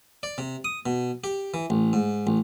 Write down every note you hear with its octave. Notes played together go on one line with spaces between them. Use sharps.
D5
C3
D#6
B2
G4
E3
A1
G#2
A1